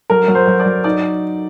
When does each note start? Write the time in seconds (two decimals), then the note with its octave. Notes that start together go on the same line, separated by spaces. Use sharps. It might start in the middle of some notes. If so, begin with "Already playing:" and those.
0.10 F#3 A#4
0.28 F#3
0.35 C5
0.47 F#3
0.60 D5
0.66 F#3
0.84 D#4 D5